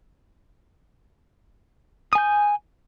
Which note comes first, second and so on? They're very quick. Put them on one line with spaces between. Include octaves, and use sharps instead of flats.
D#6 G#5 G6